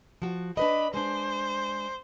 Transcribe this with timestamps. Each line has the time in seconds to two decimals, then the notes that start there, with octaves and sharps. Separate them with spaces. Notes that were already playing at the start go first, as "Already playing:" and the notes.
0.22 F3 F#4
0.57 D4 B4 D#5 B5
0.94 G#3 D4 C5